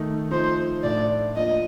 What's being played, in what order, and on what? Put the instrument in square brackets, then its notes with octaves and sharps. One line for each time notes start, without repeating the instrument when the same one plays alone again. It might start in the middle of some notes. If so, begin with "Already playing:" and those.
Already playing: [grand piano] D#3 A3 D#4
[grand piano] F3 A3 D#4 [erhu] C5
[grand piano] A2 A3 D4 [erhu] D5
[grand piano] F3 A#3 D4 [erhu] D#5